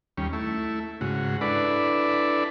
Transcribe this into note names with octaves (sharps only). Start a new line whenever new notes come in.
D#2 G3 C#4
A3 E4
G#2 C#3 F#4
D4 E4 A4 B4 D5